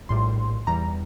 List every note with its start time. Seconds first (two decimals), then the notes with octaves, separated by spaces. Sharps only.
0.09 A#1 A2 G3 C6
0.67 E2 E3 G3 A#5